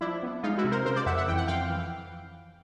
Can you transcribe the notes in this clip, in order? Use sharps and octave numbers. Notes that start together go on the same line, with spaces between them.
F3 D4 E4
B3
G#3 D#4 F4
E4 F#4
C3
A#4 C5
C#3 A#4 C5
C5 D5
F2 E5 F#5
E5 F#5
E3 G5
F#5
F2 F5 G5
E3